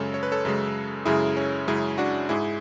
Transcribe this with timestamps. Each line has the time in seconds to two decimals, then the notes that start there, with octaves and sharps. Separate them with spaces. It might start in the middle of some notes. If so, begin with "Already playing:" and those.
Already playing: F#2 C#3 G#3 A4 C#5
0.14 C#5
0.23 B4
0.32 A4 C#5
0.45 F#2 C#3 G#3
1.05 F#2 C#3 G#3 E4 G#4
1.37 C#4
1.68 F#2 C#3 G#3 E4 G#4
1.98 D4 F#4
2.29 G#2 G#3 E4 G#4